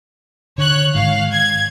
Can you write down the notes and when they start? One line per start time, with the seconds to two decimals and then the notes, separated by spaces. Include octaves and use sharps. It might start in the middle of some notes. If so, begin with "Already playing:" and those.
0.58 D3 C#5 F#6
0.95 G#2 D#3 F5
1.32 G#6